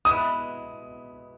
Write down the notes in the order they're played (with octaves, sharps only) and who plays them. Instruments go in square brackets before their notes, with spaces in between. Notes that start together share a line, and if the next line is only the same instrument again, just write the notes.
[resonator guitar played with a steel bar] B2 G#3 B3 E4 [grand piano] D#6